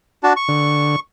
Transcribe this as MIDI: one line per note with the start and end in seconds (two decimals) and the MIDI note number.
0.24 0.33 62
0.24 0.33 66
0.24 0.33 81
0.36 1.00 85
0.48 0.96 50